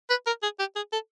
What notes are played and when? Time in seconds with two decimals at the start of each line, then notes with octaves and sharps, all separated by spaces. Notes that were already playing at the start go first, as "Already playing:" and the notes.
0.10 B4
0.26 A#4
0.43 G#4
0.59 G4
0.76 G#4
0.93 A4